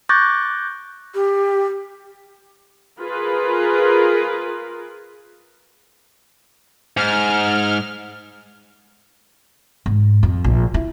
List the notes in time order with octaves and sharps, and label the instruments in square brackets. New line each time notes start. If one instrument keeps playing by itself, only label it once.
[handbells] C#6 D6 F#6 G6 A6 A#6
[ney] G4
[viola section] F4 G#4 A#4 B4
[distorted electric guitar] G#2 [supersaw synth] F6
[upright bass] G#2
F2
A#1
E4